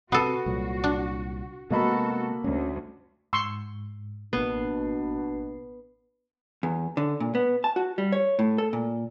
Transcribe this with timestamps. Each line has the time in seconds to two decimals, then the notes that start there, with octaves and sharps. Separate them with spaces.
0.12 C3 B3 F#4 A4 C7 D#7
0.46 C2 A#2 F#3
0.84 D4
1.70 C3 G#3 A#3 B3 F#4 A4 D#5 B5
2.44 D2 C#4
3.33 G#2 C6 C#6 E6
4.33 A1 B2 A#3 B3 D4 C7
6.63 E2
6.97 D3
7.20 A#2
7.35 B3
7.64 A5
7.76 F#4
7.98 G3
8.12 C#5
8.39 A2
8.58 A4
8.73 A#2